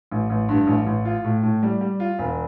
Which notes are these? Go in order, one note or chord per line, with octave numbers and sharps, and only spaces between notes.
A1
A1
G2
A1
A1
F4
A2
A2
G3
G3
F4
E1